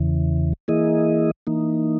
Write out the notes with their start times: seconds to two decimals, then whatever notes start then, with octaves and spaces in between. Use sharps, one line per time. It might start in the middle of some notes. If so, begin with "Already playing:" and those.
Already playing: E2 C#3 E3
0.68 E3 A#3 E4 G#4 D#5
1.47 E3 A#3 D#4